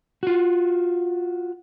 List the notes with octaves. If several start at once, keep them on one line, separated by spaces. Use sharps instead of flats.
F4 F#4